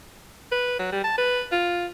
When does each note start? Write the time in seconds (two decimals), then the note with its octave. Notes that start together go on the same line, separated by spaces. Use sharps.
0.52 B4
0.79 F#3
0.92 G3
1.04 A5
1.18 B4
1.52 F4